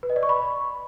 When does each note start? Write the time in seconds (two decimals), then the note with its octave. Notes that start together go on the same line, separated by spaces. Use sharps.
0.03 B4
0.10 D#5
0.16 D5
0.23 C#6
0.29 B5